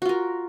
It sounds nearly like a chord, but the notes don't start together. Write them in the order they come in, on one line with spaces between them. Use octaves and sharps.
F#4 F4 A#4